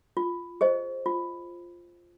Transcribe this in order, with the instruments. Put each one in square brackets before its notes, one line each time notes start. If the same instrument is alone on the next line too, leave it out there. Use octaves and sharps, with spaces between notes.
[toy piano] F4
G#4 C5 D#5
F4